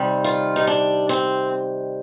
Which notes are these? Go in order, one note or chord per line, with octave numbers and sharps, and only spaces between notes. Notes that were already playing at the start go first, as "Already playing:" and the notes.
Already playing: C3 D#3 G3
F4
D#4
D4
C4